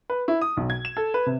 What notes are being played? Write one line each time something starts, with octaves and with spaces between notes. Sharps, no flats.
B4
E4
D#6
B1
G#6
E7
A4
B4
C3